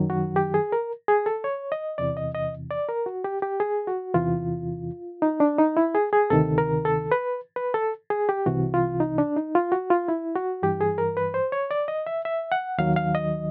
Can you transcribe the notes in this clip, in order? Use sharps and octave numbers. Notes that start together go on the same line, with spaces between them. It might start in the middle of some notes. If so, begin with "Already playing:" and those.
Already playing: F#2 D#3 F#3
F#4
G4
G#4
A#4
G#4
A4
C#5
D#5
E2 C3 E3 D5
D#5
D#5
D5
A#4
F#4
G4
G4
G#4
F#4
E2 C3 E3 F4
D#4
D4
D#4
E4
G#4
G#4
D2 C3 D#3 A4
A#4
A4
B4
B4
A4
G#4
G4
C2 C3 E3 F#4
F4
D#4
D4
D#4
F4
F#4
F4
E4
F#4
G2 E3 G4
G#4
A#4
B4
C5
C#5
D5
D#5
E5
E5
F#5
D#2 D#3 F#3 F5
F5
D#5